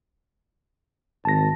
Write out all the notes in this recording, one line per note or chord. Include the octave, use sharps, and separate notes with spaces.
G#1 A5 A#6